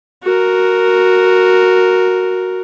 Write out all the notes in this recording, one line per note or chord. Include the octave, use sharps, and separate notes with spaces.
F#4 A#4